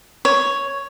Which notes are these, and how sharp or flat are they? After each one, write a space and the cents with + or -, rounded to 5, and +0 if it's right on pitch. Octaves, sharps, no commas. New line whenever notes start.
C#5 +5